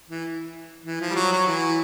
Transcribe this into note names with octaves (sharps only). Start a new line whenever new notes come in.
E3
E3
F3
G3
F#3
F#3
E3